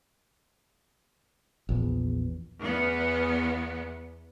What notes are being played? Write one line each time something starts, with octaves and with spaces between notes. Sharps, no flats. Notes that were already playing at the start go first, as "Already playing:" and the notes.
A#1 E2
E2 B3